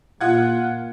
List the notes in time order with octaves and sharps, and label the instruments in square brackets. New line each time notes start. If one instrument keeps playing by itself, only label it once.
[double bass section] A#2 [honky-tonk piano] F4 F#5 G#6